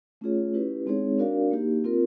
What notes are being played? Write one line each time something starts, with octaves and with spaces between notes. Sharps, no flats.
A3 C#4 F4 G#4 C#5
C#4 E4 G4 B4
G#3 C4 D#4 G#4 C#5
D4 F#4 A#4 D5 F5
A#3 D#4 G4
C4 F4 A#4